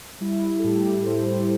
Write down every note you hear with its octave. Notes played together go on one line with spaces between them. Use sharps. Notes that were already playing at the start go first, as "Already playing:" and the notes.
G3 E4
A4
A2 G4
A2 C5